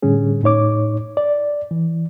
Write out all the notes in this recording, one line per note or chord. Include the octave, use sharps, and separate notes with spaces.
A2 D3 G3 C#4 G#4
A2 D#4 C#5 D6
D5
E3